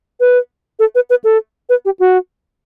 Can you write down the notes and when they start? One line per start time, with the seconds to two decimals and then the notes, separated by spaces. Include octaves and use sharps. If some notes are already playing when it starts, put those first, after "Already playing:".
0.20 B4
0.79 A4
0.95 B4
1.10 B4
1.24 A4
1.69 B4
1.85 G4
1.99 F#4